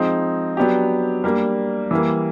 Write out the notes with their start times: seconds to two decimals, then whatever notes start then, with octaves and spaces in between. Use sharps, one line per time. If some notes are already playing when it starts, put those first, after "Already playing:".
Already playing: F3 G#3 C4 D#4
0.57 F#3 B3 D4 G4
1.24 G3 A#3 D4
1.91 E3 G3 A#3